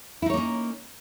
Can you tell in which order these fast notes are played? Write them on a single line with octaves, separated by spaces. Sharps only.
E4 D#4 C#5 A#3 C#4